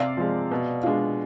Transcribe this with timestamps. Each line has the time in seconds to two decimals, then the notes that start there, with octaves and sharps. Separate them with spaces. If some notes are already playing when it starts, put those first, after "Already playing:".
Already playing: C3 D5 F5
0.17 F3 G#3
0.51 B2
0.83 G#3 D4 F4